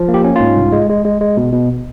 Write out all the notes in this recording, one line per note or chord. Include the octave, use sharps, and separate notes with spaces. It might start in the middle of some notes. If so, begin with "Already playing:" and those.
Already playing: F3
A#3
G4
C#4
G#2 F4
C2
G#3
G#3
G#3
G#3
B2
B2